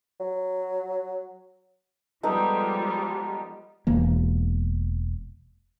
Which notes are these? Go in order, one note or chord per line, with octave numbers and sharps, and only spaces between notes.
F#3
F3 G3 G#3 B3 D#4 A4
E1 E3 A#3